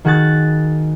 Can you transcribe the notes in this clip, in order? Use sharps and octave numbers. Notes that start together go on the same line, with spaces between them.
D#3 F#4 G#4 F#6 A6